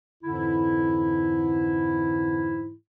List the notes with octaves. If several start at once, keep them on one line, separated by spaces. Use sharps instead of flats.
F2 G#2 D3 E3 E4